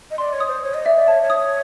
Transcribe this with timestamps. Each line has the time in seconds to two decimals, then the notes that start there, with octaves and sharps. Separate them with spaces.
0.11 D#5
0.18 D5 C6
0.33 C#5
0.40 D#6
0.48 C5
0.63 C#5 D#6
0.74 D#5
0.85 D5 E5
0.97 D5
1.08 C#5 A5
1.22 C#5
1.30 D#6
1.38 C#5